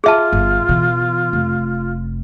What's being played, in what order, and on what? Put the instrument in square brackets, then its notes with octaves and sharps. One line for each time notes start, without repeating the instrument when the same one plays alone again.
[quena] F4 [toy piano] G#4 E5 A5
[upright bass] G1
B2 E3
F1